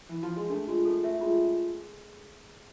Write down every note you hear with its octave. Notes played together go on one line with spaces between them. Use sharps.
E3
F3
G#3
A3 D4
G#3 F4
A3 A4
A3 E5
G#3 F4